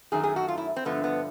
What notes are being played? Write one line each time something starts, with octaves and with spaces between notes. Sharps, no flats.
F#2 D#3 F#3 A3 G#4
G#4
F#4
F4
E4
C4
G2 D3 F3 A3 B3
B3